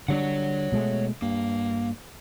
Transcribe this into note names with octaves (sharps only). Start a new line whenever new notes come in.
D3 G3 D4 C#5 F#5
B2 G#3 A3
G2 A#3